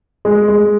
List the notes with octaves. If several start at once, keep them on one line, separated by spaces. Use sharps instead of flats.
G#3
G#3